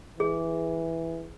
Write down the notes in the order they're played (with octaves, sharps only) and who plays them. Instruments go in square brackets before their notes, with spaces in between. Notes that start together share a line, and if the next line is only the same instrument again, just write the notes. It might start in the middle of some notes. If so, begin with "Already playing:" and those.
[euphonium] E3 [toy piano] G#4